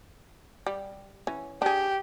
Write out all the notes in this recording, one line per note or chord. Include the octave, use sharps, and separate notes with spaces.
G3
E3 C#4
D4 G4 G#4